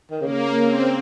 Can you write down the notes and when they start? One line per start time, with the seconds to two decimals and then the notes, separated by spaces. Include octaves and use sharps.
0.10 D#3
0.21 C#3 A#3
0.63 C4